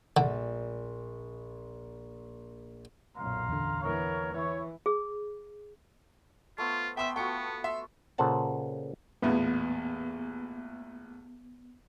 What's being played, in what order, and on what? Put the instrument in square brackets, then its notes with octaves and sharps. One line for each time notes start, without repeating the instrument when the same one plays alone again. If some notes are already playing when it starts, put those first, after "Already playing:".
[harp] A#1 [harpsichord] D3
[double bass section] B1 F#2 A#2 [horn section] F5 A#5 C6
[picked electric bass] E2 D3
[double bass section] E3 A#3 B3 [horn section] A#4 C#5
[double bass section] E3 [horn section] E4 C#5
[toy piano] G#4
[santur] A3 B3 C5 [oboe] F4
[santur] B3 [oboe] E5 [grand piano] G5 C6 E6
[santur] A3 F4 F#4 [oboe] B3 [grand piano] G5 C#7
[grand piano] E5 C6
[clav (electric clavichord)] A#2 C#3 A4 C5 F#5 A5
[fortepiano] A1 E2 A#2 [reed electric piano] B3